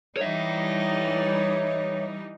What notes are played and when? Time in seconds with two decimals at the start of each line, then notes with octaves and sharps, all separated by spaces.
0.17 E3 G3 D#4 C#5 E5